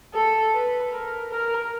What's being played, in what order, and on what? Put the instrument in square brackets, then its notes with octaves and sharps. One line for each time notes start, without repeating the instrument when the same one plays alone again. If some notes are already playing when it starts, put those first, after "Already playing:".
[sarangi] A4
B4
A#4
A#4